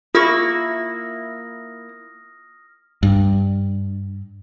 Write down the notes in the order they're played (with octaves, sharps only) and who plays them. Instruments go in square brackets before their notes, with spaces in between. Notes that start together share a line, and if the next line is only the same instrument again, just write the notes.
[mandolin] A#3 E4 C#6 [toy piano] F4 [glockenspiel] D#6 F6 A#6
[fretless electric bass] G2